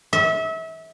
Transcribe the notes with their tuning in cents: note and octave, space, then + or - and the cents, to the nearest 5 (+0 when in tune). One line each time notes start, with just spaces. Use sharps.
E5 -30